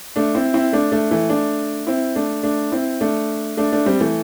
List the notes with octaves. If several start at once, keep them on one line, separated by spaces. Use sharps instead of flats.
A3 D4
C4 E4
C4 E4
A3 D4
A3 D4
E3 A3
A3 D4
C4 E4
A3 D4
A3 D4
C4 E4
A3 D4
A3 D4
A3 D4
G3 C4
E3 A3